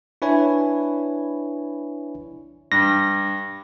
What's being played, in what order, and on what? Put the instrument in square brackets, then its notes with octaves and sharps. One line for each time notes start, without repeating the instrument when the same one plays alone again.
[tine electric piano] D4 E4 B4 C#5 G#5
[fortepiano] G2 [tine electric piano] A#6